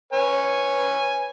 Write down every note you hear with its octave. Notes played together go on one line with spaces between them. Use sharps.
B4 C#5 G#5